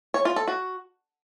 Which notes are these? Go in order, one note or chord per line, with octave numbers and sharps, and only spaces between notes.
C#5
F4
A4
F#4